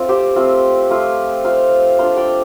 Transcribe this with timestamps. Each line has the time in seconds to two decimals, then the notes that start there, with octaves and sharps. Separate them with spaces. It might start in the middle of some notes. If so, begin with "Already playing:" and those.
Already playing: A3 C4 F4
0.09 G4 C5
0.36 A3 C4 F4
0.90 F3 A3 F4
1.45 A3 F4 C5 F5
1.98 F3 D4 F4 C5 F5
2.17 D5 G5